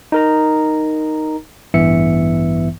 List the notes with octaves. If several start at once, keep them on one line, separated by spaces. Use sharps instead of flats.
D#4 A#4 A#5
A1 G2 E3 B3 E5 C#7